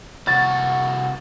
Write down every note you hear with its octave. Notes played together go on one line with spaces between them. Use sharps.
C2 F#4 A6